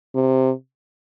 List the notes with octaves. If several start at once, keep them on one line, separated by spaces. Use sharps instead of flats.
C3